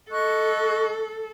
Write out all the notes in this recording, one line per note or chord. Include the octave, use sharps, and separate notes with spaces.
A4 D#5 C#6 F#6